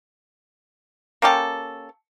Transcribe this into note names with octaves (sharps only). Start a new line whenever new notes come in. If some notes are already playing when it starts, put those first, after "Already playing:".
A#3 C#4 G4 A4